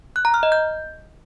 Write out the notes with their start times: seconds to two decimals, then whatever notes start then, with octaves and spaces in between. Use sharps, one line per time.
0.16 F#6
0.25 A#5
0.34 F6
0.43 D#5
0.52 G6